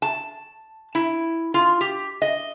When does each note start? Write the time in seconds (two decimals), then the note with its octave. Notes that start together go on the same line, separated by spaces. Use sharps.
0.02 A5
0.95 E4
1.54 F4
1.81 G4
2.22 D#5